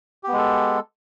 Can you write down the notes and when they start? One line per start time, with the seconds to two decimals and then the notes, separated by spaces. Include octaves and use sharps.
0.23 G4
0.28 B3
0.33 G#3
0.37 A4